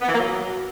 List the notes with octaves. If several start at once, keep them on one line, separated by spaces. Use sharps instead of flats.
B3
E3
A#3
F#3